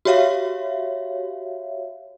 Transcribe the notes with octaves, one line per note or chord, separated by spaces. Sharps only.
F#4 G4 C#5 E5 F5